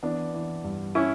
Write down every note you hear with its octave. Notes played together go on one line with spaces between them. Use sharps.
E3 B3 D4
E3
G2
C#4 E4